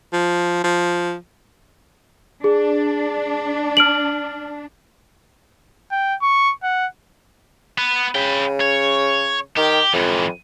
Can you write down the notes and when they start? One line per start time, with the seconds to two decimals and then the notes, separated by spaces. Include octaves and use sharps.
0.13 F3
0.64 F3
2.44 D4 G#4
3.77 F6 D7 F#7
5.91 G5
6.22 C#6
6.63 F#5
7.78 B3
8.15 C#3 B4 G5
8.61 C#5
9.57 D#3 G4
9.93 F2 G#2 E3